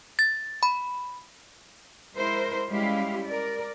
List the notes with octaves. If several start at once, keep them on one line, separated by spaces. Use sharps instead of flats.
A6
B5
G#3 E4 A#4 C5
G3 G#3 C#4 E4 G4 F5
A#4 D5